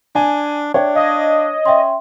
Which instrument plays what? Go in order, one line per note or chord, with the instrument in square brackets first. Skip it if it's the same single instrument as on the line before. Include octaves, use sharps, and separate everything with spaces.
[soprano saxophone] D4 [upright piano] G#5
[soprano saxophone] D4 [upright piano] C#5 [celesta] D5 E5 G5
[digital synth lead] D#5 [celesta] F5 D#6 G#6
[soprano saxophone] C#4 [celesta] E5 G5 C6